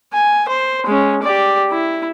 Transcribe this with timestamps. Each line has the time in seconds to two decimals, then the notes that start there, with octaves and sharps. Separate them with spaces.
0.13 G#5
0.48 C5
0.87 G#3 C#4
1.23 G4 D5
1.71 E4